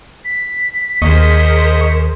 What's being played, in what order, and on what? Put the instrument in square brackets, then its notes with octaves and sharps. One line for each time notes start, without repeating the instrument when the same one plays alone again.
[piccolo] B6
[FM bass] D#2 [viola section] G#4 A#4 C5 [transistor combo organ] D#5 C#6